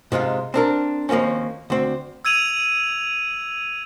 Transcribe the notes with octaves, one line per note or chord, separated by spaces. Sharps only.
G#2 C3 G#3 F4
C4 D4 A#4
D#2 F3 A#3 C4 C#4
D2 C4
E6 G#6 D#7 F7 F#7